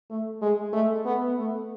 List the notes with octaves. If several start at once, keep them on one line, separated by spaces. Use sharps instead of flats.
A3
G#3
A3
B3
A3